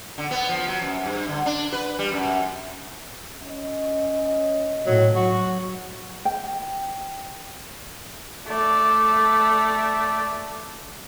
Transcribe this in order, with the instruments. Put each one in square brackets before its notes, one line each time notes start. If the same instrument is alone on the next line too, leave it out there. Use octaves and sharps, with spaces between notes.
[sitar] D3
B3
F3
F#3
F#2
G2
D3
D4
B4
G3
F#2
[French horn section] C#4 D#5
[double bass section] A2 [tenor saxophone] F#3
[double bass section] F#3 [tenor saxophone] F#4
[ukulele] G5
[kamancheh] A3 D5